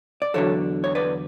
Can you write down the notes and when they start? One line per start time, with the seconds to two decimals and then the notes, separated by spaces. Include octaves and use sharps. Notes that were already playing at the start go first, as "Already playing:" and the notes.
0.22 D5
0.34 E2 D3 F#3 A4 C#5
0.84 C#5
0.95 B4 D5